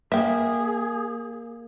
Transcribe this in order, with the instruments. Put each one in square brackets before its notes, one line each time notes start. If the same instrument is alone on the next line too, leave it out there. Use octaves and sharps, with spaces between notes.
[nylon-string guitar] A#3 [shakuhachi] G#4 [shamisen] E5 G5